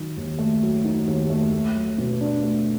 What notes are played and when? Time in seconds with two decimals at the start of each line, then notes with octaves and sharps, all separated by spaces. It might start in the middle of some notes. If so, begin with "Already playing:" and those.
Already playing: D#3 F#3
0.17 D#2
0.39 A3
0.62 F#3
0.84 D#3
1.07 D#2
1.30 A3
1.53 A3
1.75 F#3
1.98 B2
2.21 D4
2.43 A3